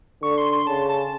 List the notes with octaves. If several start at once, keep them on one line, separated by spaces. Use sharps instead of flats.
D3 C#6
C6
C6
C#3 A5
A5